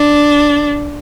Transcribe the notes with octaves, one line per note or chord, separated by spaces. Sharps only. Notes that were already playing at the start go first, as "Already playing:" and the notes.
Already playing: D4